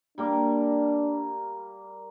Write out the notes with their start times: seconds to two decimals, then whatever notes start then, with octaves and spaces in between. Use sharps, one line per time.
0.18 G3 A#3 D4 D6